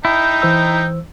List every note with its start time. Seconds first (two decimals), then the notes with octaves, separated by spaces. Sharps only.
0.05 D#4 E4 G5
0.42 E3 C5 E6